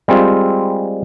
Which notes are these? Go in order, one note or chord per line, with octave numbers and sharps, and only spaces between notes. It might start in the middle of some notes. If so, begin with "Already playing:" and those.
G3 G#3 C4 F4